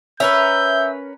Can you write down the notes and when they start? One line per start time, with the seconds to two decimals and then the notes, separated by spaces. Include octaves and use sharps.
0.20 C#4 A#4 B4 E5 E6 G6